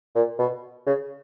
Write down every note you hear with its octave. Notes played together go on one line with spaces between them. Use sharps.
A#2
B2
C#3